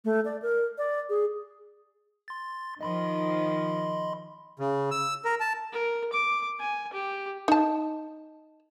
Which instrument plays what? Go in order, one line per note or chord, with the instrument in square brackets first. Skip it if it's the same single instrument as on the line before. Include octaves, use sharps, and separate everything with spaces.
[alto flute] A3
D5
A#4
D5
G#4
[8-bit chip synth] C6 A6
[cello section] D#3 F3 [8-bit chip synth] D#5 B5 C6
[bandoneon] C#3
E6
A#4
A5
[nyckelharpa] A#4
D6
G#5
G4
[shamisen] D#4 A5